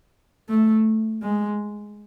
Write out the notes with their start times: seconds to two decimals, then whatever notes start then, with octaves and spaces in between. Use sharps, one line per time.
0.49 A3
1.23 G#3